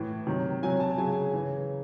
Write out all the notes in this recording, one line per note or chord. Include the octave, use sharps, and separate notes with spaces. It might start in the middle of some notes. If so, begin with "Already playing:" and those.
Already playing: A2 E3
C3 D#3 F#3
C3 F#3 G#5
A5
C#3 F#3 G#5
C#3 E3